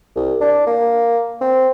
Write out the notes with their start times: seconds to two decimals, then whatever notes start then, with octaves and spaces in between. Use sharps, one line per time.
0.16 C2
0.41 D4
0.66 A#3
1.41 C4